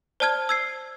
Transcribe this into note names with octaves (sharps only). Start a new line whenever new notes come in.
C5 D5 A5 F6 G#6
E6 G#6 C7